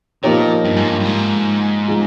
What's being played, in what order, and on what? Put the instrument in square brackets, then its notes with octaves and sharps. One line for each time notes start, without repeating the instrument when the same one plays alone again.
[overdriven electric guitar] A#2 [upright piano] F3 A#3 D#4 G4 C#5
[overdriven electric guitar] G2
G#2
G2
G2
G#2
[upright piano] F3 G#3 D#4